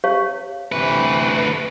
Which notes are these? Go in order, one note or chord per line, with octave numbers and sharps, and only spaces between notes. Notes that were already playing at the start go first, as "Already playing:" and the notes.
G4 C#5 F5
D2 C3 E3 A3 B4